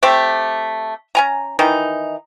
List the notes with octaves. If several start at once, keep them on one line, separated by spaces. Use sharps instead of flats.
A3 C4 G4 E5
C#4 G#5 A#5
D#3 E3 D#4